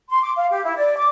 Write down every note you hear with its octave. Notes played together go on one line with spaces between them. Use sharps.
C6
D6
F5
G4
E4
D5
D6